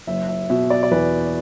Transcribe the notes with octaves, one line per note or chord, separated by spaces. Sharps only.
F#1 E5
E5
B2 E5
D5
D5
E2 B4